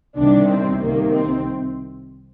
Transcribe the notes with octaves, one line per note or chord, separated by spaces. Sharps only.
C2 C3 D#3 D4
C4
C2 C3 D#3 A#3
C4